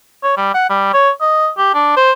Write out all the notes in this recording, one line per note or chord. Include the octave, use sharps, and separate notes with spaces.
C#5
G3
F#5
G3
C#5
D#5
G4
D4
C5